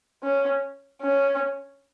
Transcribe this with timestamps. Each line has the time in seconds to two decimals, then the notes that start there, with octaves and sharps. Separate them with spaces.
0.23 C#4
1.02 C#4